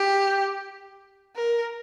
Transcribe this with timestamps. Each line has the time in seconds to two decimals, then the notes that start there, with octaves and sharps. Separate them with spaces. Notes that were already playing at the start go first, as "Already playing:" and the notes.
Already playing: G4
1.36 A#4